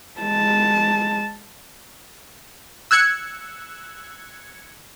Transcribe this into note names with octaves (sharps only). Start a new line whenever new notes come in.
G#3 A5
E6 F#6 G#6 C#7